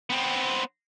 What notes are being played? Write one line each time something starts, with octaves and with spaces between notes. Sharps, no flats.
B3 C4